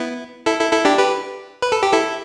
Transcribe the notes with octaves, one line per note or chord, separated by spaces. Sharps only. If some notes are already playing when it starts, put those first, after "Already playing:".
Already playing: B3 E4
E4 A4
E4 A4
E4 A4
D4 G4
G4 B4
B4
A4
G4
E4 A4